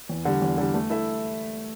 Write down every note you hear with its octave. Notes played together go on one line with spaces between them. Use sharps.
E2
D3 G3
E2
D3 G3
A3
E4 A4 E5